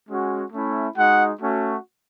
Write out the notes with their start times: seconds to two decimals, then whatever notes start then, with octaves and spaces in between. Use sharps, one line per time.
0.09 G#3 C#4 F#4
0.52 A3 C#4 E4
0.97 G#3 D#4 F#4 F#5
1.41 A3 C#4 F#4